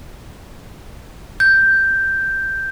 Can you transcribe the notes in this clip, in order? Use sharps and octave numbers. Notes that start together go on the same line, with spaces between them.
G6